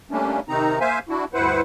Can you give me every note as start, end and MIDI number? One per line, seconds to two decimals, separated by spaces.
0.11 0.40 55
0.11 0.40 57
0.11 0.40 58
0.11 0.40 61
0.11 0.40 62
0.49 0.79 48
0.49 0.79 51
0.49 0.79 60
0.49 0.79 63
0.49 0.79 82
0.80 0.99 58
0.80 0.99 72
0.80 0.99 76
0.80 0.99 77
0.80 0.99 80
1.09 1.25 62
1.09 1.25 64
1.09 1.25 66
1.34 1.61 38
1.34 1.61 43
1.34 1.61 64
1.34 1.61 71
1.34 1.61 72
1.34 1.61 78